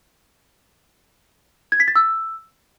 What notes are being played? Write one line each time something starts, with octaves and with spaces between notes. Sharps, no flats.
G#6
B6
A6
E6